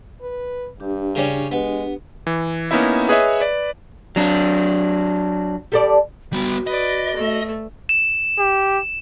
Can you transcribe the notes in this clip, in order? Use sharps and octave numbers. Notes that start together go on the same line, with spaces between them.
B4
G2 D4 G4
C#3 G3 C#4
G#3 B3
E3
A#3 B3 C#4 D#4 E4 E5
G#4 B4 C#5 D#5 E5
B4 D5
F#3 D4
G3 A4 D5
G3 B3 F#4
B4 D5 D#5
A3
E7
G4